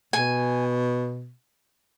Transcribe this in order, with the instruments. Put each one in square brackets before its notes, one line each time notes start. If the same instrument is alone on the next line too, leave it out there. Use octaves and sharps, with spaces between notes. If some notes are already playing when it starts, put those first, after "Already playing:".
[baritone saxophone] B2 [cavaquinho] G#5